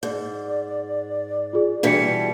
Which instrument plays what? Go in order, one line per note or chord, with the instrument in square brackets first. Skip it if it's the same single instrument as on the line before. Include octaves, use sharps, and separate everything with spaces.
[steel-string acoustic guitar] G#2 [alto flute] D5
[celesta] F4 G#4
[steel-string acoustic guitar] B2 E3 G3 [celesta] D4 B6 C#7